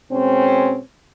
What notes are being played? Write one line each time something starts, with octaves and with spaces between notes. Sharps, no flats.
B2 G#3 C4 C#4